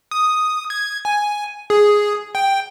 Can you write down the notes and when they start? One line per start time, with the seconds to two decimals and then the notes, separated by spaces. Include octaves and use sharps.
0.11 D#6
0.70 G#6
1.05 G#5
1.70 G#4
2.35 G5